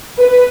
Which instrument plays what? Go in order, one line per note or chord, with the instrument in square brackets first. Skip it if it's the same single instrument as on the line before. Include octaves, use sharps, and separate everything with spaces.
[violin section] B4